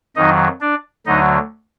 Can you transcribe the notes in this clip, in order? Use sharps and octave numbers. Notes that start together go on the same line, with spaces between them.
F2 D#3 F#3 D#4 D#5
D4 D5
D2 D3 F#3 D#4 D#5